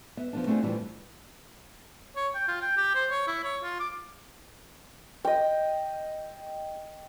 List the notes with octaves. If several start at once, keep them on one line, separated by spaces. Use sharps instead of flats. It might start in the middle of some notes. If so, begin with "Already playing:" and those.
B3 E5
F3 B3 D4
A3 B3 C4 D4 F4 G#4
D2 A2 E3 F3 G3 D4
C#5
G5
F4
G5
G4
C5
C#5
E4
C#5
F4
D6
D#5 G5